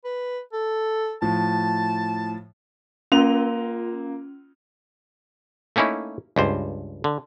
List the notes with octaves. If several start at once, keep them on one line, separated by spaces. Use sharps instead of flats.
B4
A4
A2 F3 A5
A#3 C#4 F4 F7
A3 A#3 C#4 D#4 E4
C#2 G2 C5
D3